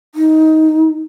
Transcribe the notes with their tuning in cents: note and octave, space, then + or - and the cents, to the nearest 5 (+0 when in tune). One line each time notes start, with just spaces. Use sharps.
D#4 +20